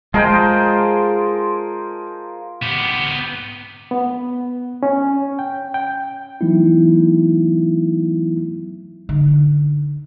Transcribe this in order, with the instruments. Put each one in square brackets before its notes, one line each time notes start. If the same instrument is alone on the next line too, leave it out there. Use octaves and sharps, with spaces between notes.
[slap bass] G#3 [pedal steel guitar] F4 C5 [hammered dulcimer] G#4 A#4 G5 [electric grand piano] D#5 A5
[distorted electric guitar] B3 G4
[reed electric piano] B3
C#4
G5
G5
[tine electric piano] E3 F#3 A3 B3 D#4 E4
[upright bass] D3 D#4